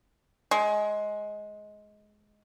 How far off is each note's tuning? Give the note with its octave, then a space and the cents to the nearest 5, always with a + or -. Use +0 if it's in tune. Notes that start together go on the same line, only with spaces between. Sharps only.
G#3 +15